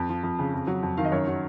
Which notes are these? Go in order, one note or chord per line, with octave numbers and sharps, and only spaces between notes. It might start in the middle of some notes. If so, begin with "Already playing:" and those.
Already playing: F2
F3
F2
C#3
F2
F#3
F2
D#3 F5
D#5
F#2 A#4 C#5
F#3